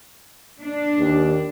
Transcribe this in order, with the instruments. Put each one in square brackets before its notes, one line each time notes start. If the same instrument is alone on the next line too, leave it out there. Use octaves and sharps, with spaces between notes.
[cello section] D4
[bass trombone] D#2